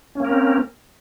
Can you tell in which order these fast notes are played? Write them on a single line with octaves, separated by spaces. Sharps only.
C#4 A#3 A#4 C4